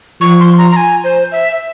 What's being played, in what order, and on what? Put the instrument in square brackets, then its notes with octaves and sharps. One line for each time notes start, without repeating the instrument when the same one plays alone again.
[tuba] F3 [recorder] C#6
[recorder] C6
A#5
A#5
G#5
C5
E5